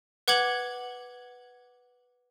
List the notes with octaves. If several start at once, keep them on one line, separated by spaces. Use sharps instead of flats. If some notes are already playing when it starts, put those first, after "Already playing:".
B4 F#5 D6 G#6 F#7